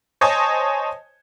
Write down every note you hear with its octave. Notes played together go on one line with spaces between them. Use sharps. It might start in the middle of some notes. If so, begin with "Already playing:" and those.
C5 C#5 D#5 G#5 A5 D#6